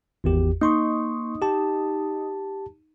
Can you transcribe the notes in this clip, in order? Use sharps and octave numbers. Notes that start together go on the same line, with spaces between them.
G#1 E2 G4
A#3 D#4 C6 C#6
G4 A5